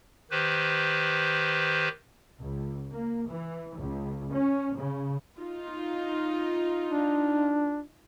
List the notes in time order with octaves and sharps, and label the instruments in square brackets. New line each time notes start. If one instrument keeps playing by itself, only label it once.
[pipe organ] D#3 G4 B4 C5
[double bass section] C#2
A#3
E3
C#2
C#4
C#3
[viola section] D#4 F4
[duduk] D4